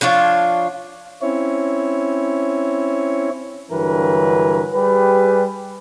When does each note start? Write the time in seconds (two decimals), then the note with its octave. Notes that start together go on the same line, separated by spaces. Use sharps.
0.01 F3 D4 F4 C#5
1.22 C4 C#4 E4 C#5
3.70 G2 D3 E3 F#3 A#4 B4
4.73 G3 G4 G#4 B4